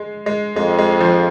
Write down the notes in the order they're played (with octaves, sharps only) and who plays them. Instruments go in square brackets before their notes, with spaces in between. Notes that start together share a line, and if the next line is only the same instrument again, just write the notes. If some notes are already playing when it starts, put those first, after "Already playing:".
Already playing: [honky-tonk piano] G#3
G#3
[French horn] F2 [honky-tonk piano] G#3
[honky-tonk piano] G#3
F3